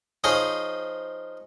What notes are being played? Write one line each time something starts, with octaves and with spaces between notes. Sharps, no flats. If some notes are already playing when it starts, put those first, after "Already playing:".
F3 D#4 G#4 C5 C#5